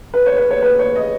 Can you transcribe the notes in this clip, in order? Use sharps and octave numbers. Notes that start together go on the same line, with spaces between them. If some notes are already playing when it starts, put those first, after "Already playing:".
B4
C#5
B4
C#5
B4
C#5
D#5